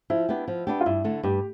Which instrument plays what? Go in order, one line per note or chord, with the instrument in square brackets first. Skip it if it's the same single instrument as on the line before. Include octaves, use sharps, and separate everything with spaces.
[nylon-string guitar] F3 [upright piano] E4
[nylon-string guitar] B3 D4 G4
F3
B3 D4 G4
[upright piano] F4
[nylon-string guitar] G2 [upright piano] E4
[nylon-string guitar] D3 A3
[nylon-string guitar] G2 [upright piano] G4